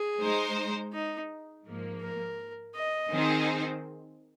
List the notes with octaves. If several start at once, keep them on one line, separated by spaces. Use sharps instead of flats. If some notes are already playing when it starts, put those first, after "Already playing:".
Already playing: G#4
G#3 D#4 C5
D#4
G#2 F3 A#3
A#4
D#5
D#3 C4 D#4 G#4 C5